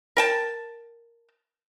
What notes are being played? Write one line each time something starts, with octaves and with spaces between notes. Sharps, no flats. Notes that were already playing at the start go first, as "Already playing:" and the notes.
A#4 G5 A5